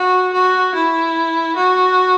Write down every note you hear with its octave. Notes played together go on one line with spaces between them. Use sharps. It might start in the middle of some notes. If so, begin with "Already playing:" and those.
Already playing: F#4
F#4
E4
F#4